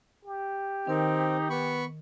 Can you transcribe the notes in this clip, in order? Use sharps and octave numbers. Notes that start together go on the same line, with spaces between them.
G4
D#3 C4 D#4 A#4
B3 B5 C#6